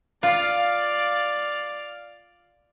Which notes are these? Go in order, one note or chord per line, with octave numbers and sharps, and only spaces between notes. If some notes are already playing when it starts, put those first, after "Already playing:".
F4 D5 F5